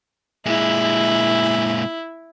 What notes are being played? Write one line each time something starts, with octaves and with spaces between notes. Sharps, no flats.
A#2 G#3 E4